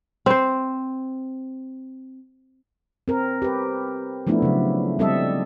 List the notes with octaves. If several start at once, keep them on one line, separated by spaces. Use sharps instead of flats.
C4 C5
C4 A#4
G4 B4
F3 A3 B3 D4 E4
C#3 F#3
G3 C4 A4 D#5 E5